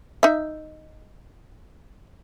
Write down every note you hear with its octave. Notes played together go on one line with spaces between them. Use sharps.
D#4 E5